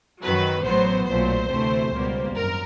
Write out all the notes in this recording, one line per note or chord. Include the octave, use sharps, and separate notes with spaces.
F#2 D#3 F#3 B4
A1 A2 F#3 B3 C5
B1 A#2 F#3 A3 C5
D2 C3 E3 A3
C#2 B2 G3 A#3
G#1 F#2 A#4